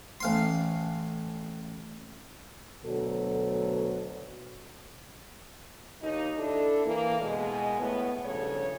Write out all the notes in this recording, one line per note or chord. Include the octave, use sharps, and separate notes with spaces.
A1 F5 C6
D2 B2 F#3 A4
D#2 D#4
D4 E4 A4
E3 A#3
B2 G#3
A2 B3
G2 C#3 F3 A4 C#5